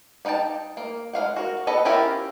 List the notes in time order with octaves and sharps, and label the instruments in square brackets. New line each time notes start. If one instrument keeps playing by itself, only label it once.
[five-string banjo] B3 D#4 F#5 G5 A5
A#3
G#3 D#4 F5 F#5
F#4 A#4
B3 A4 B4 D#5
C#4 E4 F4 G4 A#4